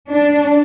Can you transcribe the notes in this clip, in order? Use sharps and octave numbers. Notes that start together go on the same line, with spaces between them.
D4